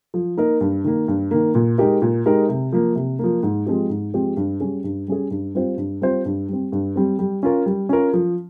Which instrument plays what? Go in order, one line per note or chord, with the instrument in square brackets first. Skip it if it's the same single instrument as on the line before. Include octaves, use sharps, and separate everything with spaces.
[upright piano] F3
A#3 D#4 A#4
G2
D#3 A#3
G2
D#3 A#3
A#2
G#3 D#4 G4 A#4
A#2
G#3 D#4 G4 A#4
C3
F3 A#3
C3
F3 A#3
G#2
F3 G#3 C4 G4
G#2
F3 G#3 C4 G4
G2
G3 C#4 G#4
G2
G3 C#4 G#4
G2
G3 C4 F4 C5
G2
G3 C4 F4 C5
G2
G3 C4
G2
G3 C4
G3
C#4 F4 A#4
G3
C#4 F4 A#4
F3